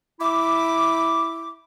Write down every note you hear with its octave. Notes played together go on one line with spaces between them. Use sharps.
E4 D6